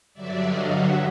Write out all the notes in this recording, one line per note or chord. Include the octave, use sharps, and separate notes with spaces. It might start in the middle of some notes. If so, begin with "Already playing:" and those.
G2 D3 F#3 D5 E5
D#5 F5
E5 F#5